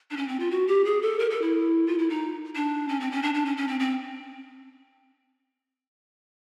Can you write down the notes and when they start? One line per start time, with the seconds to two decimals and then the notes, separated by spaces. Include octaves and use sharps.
0.11 D4
0.17 C#4
0.28 C4
0.40 F4
0.51 F#4
0.67 G4
0.85 G#4
1.02 A4
1.19 A#4
1.30 A4
1.42 E4
1.87 F4
1.98 E4
2.10 D#4
2.55 D4
2.88 C#4
3.00 C4
3.11 C#4
3.23 D4
3.34 D4
3.45 C#4
3.57 C#4
3.68 C4
3.80 C4